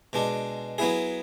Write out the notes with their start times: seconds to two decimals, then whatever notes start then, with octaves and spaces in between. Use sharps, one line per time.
0.13 B2 G#3 D4
0.78 F#3 B3 E4 G#4